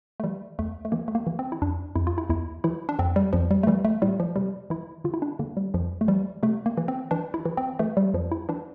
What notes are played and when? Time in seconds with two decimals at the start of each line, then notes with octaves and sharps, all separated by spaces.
0.20 A3
0.24 E3 G3
0.59 E2 A3
0.85 A3
0.92 E3 A#3
1.08 A3
1.15 A#3
1.27 E3
1.39 C4
1.52 E4
1.62 F2 D4
1.95 F2 E4
2.07 F4
2.18 E4
2.29 E2 E4
2.64 E3 E4
2.89 D4
2.99 F2 C4
3.16 G3
3.33 F2 F3
3.51 G3
3.63 A3
3.67 E3 G3
3.85 A3
4.02 A2 G3
4.20 F3
4.36 C3 G3
4.70 E3 E4
5.04 D3 F4
5.14 E4
5.22 D4
5.39 D3 A#3
5.57 G3
5.74 F2 F3
6.01 A3
6.08 E3 G3
6.43 C3 A3
6.66 A#3
6.77 E3
6.88 C4
7.11 E3 D4
7.34 E4
7.45 E3
7.57 C4
7.79 E3 A3
7.97 G3
8.14 F2 F3
8.32 E4
8.49 E3 D4